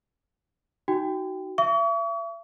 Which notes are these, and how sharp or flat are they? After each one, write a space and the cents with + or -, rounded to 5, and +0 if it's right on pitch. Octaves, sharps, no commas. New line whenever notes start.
D#4 +10 F#4 +20 G5 +5
E5 +40 C#6 +40